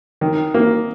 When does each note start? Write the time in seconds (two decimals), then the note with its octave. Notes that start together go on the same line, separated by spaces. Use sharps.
0.21 D#3
0.54 A#3